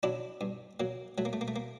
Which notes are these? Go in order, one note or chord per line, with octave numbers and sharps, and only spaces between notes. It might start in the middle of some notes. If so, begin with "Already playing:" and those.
F#3 D4 E4
G2
F#3 A#3
F#3 A3
A#3
A3
A#3
A3
A#3